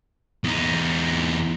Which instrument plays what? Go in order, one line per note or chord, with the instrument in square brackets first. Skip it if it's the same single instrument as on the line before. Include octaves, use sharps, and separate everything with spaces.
[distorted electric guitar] E2 D#4